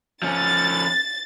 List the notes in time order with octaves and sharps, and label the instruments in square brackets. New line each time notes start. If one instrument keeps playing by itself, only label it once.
[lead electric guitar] F3 C#4 [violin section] A6